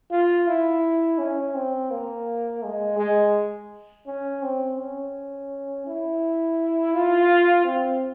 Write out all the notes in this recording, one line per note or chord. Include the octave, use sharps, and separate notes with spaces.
F4
E4
C#4
C4
A#3
G#3
G#3
C#4
C4
C#4
E4
F4
C4